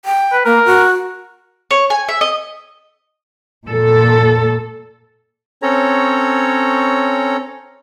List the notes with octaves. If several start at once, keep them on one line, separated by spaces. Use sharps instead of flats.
G5
B4
A#3 A#4
F#4
C#5
G#5
E5
D#5
A#2 A4
C4 C#4 A4 C#5 A#5